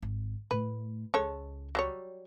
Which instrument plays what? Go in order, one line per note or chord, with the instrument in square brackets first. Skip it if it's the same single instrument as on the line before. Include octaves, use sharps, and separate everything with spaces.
[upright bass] G#1
[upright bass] A2 A3 [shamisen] B4
[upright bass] C#2 [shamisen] G#3 A4 C#5
[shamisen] F#3 G3 C#5